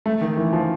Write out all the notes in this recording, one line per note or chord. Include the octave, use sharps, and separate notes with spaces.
A3
D#3
E3
F3